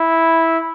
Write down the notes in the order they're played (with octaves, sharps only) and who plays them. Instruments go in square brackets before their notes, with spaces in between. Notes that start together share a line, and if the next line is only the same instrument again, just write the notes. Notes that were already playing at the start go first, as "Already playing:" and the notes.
Already playing: [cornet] E4